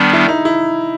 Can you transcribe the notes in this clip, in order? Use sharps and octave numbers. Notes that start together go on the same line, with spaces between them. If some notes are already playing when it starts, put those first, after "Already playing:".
Already playing: D#3 G3 B3 D4
E4
D#4
E4